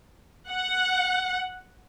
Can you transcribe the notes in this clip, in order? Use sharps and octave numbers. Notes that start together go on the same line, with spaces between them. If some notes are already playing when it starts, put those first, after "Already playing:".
F#5